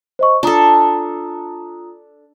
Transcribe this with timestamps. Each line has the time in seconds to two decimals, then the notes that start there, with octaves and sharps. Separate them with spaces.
0.19 C5 D#5 C#6
0.43 D4 F4 A4 A#5 D#6